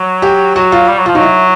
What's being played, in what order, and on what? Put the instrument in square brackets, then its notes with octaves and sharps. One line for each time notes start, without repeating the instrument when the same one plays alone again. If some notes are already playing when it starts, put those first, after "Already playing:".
Already playing: [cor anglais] F#3
[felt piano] G4
[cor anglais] F#3 [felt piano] F#4
[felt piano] F4
[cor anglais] G3
F#3
[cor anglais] F3 [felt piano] F4
[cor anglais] F#3 [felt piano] D#4
[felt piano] E4